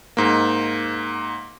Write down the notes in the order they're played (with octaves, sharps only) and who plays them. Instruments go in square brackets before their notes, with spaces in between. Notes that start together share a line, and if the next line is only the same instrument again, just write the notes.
[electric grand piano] G#2 A#3